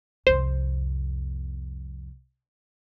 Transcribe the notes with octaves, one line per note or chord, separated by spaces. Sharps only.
C2 F2 C5